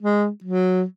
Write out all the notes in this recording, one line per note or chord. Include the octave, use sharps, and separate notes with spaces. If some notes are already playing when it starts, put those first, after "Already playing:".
G#3
F#3